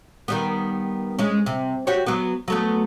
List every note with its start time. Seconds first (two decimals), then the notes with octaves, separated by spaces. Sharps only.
0.28 D#3 G3 B3
1.19 G#3 C#4
1.46 C3
1.87 F#4 G4 C#5
2.06 F#3 B3
2.48 F#3 A3 B3